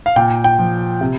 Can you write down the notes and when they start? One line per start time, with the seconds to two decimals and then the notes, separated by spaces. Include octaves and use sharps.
0.06 F5
0.16 A#2 G5
0.44 G5
0.59 F3
1.01 C3